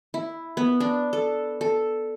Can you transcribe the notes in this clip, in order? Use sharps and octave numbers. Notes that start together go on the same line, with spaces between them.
E4
B3
D4
A4
A4